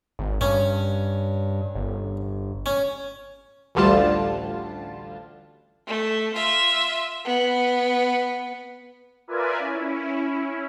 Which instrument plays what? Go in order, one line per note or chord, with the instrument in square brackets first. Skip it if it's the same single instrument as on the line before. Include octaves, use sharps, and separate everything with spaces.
[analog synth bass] G#1
[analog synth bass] G2 [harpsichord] C#4
[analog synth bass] G1
[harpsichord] C#4
[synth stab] A1 D2 D3 G3 F4 A5
[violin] A3
F4 E5
B3
[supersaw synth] F4 A#4 B4 D5 E5 G#5
C#4 E4